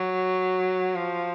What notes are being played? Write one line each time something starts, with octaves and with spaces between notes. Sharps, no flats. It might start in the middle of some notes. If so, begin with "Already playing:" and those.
Already playing: F#3
F3